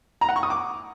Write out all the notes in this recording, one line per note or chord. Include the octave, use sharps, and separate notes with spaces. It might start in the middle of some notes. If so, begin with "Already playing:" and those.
A#5
F#5
C#6
D#6
D6